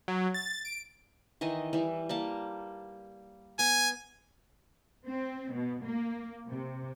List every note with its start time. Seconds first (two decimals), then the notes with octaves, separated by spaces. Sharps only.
0.08 F#3
0.34 A6
0.65 D7
1.41 D#3 E3 D#5
1.73 E3 G3
2.09 G3 A#3 A5
3.59 B3 G#5
5.07 C4
5.53 B2
5.84 A#3
6.47 C3